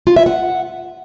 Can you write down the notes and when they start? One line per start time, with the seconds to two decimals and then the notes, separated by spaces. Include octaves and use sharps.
0.07 F4
0.16 E5
0.26 F#5